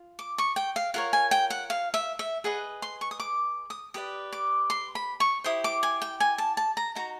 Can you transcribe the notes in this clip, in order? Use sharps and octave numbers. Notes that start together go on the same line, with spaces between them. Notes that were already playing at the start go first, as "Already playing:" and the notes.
Already playing: F4
D6
C#6
G5
F5
F4 A#4 C#5 F#5
G#5
G5
F#5
F5
E5
E5
G#4 B4 D#5 F#5
C6
C#6
D#6
D6
D#6
G4 B4 D5 D#6
D6
C6
B5
C#6
E4 G4 C5 D#6
D6
G#5
G5
G#5
A5
A5
A#5
D#4 F#4 A#5